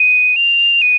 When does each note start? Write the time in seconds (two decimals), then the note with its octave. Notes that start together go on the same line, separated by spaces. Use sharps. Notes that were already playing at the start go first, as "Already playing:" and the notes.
Already playing: D#7
0.36 F7
0.82 D#7